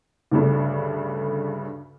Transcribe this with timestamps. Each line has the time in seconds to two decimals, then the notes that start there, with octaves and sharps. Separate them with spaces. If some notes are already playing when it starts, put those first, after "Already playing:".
0.31 D2 G2 C#3 A3 D4